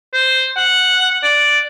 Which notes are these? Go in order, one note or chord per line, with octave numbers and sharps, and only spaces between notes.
C5
F#5
D5